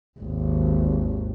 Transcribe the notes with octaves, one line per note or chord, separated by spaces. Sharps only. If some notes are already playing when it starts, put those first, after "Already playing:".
G#1 D#2